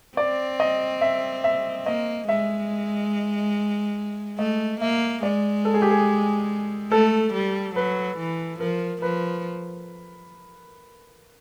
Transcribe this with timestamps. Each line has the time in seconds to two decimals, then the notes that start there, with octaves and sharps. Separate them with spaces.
0.17 C4 D5
0.60 D#5
1.01 E5
1.44 E5
1.86 A#3 D#5
2.28 G#3 E5
4.39 A3 D#5
4.81 A#3 E5
5.23 G#3 D5
5.65 A4
5.74 G#4
5.82 G4
5.90 G#4
6.91 A3 A4
7.34 G3
7.75 F#3 B4
8.18 E3
8.60 F3 A#4
9.02 F3 B4